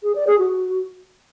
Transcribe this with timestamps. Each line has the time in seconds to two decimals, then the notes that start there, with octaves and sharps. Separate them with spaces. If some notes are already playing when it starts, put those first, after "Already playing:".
0.03 G#4
0.15 D5
0.27 G#4
0.38 F#4